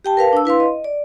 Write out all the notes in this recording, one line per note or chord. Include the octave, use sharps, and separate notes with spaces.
G4 G5 A5
A#4 B4 F5 A5
D4 E6
E4 B4 F5 C6
D#5
D5